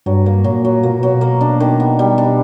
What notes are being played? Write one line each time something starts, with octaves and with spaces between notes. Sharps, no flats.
G2 F#3
A#3
A#2 F#3
F#3
B2 A#3
A#2
B2 F#3
A#3
D4
D#3
B3
G3
D4